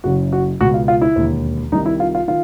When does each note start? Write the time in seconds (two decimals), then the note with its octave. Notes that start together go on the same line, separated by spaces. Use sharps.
0.04 F#1 F#2 C#3 F#4
0.33 F#4
0.60 C#2 B2 F#4
0.74 F4
0.88 F4
1.01 E4
1.16 E1 D#2 D3
1.72 C2 C3 D#3 D#4
1.86 E4
2.00 F4
2.15 F4
2.28 D#3 F4